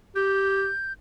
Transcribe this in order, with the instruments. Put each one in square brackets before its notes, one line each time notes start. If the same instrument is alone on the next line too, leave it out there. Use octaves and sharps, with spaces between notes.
[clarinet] G4 [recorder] G6